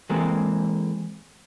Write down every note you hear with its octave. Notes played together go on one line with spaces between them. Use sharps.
E3 G#3 A#3 C4 G#4 A4